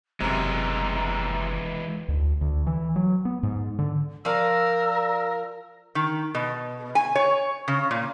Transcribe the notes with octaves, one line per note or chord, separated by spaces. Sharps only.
F#1 F#2 C3 E3 G#3 A#5
D2
D2
E3
F#3
B3
G#2
D3
F3 A#4 D5 F5 E6
D#3
B2
G#5
C#5
C#3
A#2